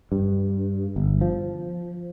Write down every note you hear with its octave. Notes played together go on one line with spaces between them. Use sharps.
G2
G1
F3